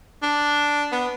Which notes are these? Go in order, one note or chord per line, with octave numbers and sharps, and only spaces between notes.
D4
B3